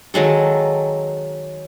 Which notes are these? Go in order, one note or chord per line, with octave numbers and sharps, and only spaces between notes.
D#3 F#3 G#3 A4